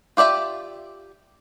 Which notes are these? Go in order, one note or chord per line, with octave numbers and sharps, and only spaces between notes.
F4 G4 D5 E5 G5